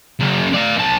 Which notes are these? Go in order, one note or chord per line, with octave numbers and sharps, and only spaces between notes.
F#2 C#3
D5 F5
B1 A5